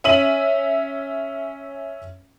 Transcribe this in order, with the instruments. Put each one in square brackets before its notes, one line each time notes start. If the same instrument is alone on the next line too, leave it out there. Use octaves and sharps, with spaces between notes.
[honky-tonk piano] C#4 E5 D#7 F#7